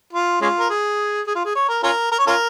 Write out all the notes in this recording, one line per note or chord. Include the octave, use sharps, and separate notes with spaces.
F4
G#3 C#4 F4
A#4
G#4
G#4
F4
G#4
C#5
A#4
C#4 F4 A#4
A#4
C#5
C#4 F4 A#4